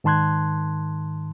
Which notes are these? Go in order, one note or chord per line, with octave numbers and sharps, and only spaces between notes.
G#2 D#3 A5 C6 F#6 G#6